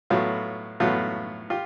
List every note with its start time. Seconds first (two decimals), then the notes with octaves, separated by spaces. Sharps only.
0.10 A2 F#3 B3 F4
0.80 A2 F#3 B3 F4
1.50 F4 G4